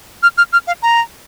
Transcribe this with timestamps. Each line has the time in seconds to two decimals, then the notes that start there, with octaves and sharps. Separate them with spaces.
0.23 F6
0.38 F6
0.53 F6
0.67 F5
0.82 A#5